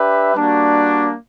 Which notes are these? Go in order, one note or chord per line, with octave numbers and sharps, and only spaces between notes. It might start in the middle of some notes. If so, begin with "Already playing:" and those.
Already playing: D4 G4 B4 E5
G3 A#3 D4 F#4